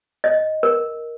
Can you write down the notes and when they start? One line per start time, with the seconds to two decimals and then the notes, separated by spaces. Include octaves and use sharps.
0.24 D#5
0.63 A#4